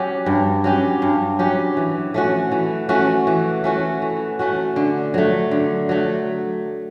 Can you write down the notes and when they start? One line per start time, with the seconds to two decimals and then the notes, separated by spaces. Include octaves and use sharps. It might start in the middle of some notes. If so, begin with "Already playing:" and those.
Already playing: F#3 C#4 G4
0.26 G2
0.64 F#3 C#4 G4
1.02 G2
1.39 F#3 C#4 G4
1.77 E3
2.14 A3 C#4 F#4
2.52 E3
2.89 A3 C#4 F#4
3.27 E3
3.64 A3 C#4 F#4
4.02 E3
4.39 A3 C#4 F#4
4.76 D3
5.14 F#3 A3
5.51 D3
5.89 F#3 A3